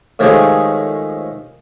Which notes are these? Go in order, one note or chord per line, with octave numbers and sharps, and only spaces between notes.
A2 D#3 F3 G#3 G4 G#4